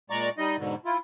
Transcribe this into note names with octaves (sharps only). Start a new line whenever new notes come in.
A#2 G#3 D5 A#5 C#6 D6
G3 D#4 D#5
G#2 B2 D3
E4 F4